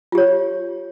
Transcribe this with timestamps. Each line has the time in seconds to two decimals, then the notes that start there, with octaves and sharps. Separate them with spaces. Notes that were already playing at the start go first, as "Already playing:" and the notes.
0.12 F4
0.15 G4
0.18 C#5